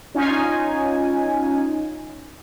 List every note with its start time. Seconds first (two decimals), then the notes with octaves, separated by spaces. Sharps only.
0.15 C#4 D#4 F4 G#5